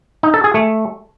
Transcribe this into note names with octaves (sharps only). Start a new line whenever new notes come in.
D#4
A4
G#4
A3